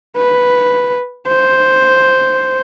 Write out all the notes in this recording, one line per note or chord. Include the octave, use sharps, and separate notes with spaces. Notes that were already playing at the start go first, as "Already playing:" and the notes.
B4
C5